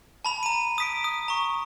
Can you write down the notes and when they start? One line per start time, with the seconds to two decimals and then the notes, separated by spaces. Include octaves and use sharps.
0.25 A5 B5 F7
0.43 A#5 D#7
0.78 D#6 B6 D7
1.04 D#6
1.28 A#5 C#6